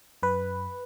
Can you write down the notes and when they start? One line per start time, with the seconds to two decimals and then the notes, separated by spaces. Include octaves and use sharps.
0.23 F#2 B4